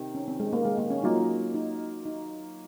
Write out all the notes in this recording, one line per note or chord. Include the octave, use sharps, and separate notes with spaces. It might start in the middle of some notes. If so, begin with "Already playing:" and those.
Already playing: C3 D#3
C#4
C4
G#3
A#3
G#3
A#3
C#4
F#3 A#3 D#4 F4
D#4
D#4